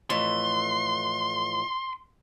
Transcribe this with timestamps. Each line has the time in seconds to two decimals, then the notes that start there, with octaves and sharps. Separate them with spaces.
0.10 F2 A2 E3 C6